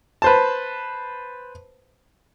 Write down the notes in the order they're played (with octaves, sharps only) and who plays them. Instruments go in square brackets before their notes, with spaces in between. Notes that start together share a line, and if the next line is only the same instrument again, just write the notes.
[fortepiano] B4 C5 A5